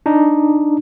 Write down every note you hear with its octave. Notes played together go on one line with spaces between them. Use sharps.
D4 D#4